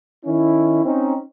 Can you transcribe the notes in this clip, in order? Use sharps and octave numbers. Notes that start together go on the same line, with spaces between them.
D#3 C#4 E4
C4 C#4 D#4